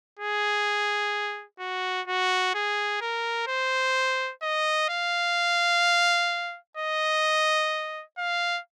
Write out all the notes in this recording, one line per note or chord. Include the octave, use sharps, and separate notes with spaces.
G#4
F#4
F#4
G#4
A#4
C5
D#5
F5
D#5
F5